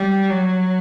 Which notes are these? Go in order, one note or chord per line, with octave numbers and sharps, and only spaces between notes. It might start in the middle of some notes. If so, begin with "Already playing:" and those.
Already playing: G3
F#3